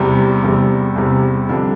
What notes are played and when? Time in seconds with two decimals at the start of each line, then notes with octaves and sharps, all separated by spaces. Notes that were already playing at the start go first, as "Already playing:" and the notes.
Already playing: E2 C3 G3
0.44 E2 C3 G3
0.96 E2 C3 G3
1.49 F2 D3 G3 D4